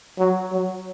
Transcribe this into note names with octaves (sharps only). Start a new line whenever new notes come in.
F#3
F#3